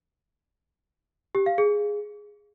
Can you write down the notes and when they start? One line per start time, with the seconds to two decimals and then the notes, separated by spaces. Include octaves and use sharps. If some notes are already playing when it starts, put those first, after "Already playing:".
1.35 G4
1.46 F5
1.58 G#4